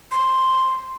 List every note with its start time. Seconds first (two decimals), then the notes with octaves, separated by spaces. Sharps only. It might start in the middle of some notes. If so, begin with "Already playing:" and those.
0.11 C6